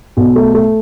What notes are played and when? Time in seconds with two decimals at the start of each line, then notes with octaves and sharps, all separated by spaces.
0.17 B1
0.36 A3
0.55 A3